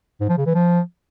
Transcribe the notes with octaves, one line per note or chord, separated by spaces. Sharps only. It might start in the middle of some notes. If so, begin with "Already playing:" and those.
G#2
F3
C#3
E3
F3